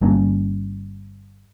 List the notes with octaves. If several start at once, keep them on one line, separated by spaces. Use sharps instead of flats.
G1 G2 A#3 C#4